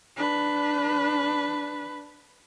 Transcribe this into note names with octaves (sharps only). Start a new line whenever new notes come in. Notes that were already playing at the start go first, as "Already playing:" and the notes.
D4 B4